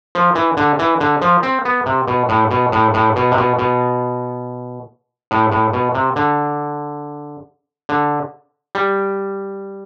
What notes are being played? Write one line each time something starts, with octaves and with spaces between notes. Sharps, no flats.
F3
E3
D3
E3
D3
F3
C4
B3
C3
B2
A2
B2
A2
A2
B2
C3
B2
B2
A2
A2
B2
C3
D3
D3
G3